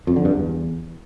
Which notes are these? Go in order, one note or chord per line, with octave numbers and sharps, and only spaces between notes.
F2
D3
G2
E2